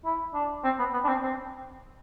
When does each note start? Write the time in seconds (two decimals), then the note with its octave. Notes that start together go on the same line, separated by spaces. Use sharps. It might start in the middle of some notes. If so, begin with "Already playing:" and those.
0.05 E4
0.34 D4
0.64 C4
0.79 B3
0.93 B3
1.04 D4
1.08 C4
1.22 C4